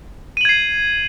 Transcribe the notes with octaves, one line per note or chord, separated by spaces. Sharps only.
G#6 C7 D#7 F#7